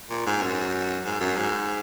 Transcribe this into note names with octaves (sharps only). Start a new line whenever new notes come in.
A#2
G#2
F#2
G#2
F#2
G#2